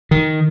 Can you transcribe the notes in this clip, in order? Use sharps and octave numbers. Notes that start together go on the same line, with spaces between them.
D#3